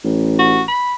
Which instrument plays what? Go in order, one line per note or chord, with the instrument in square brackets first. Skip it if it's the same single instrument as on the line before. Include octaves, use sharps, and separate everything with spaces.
[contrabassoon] A1
[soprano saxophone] F#4
B5